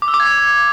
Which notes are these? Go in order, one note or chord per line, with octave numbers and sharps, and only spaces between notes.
D6
E6
D6
G#6